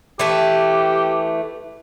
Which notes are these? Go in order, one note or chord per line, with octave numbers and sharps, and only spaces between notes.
E3 A3 G4